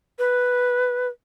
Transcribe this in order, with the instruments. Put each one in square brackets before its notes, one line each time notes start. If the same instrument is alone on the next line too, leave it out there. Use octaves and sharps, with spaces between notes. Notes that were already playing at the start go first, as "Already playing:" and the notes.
[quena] B4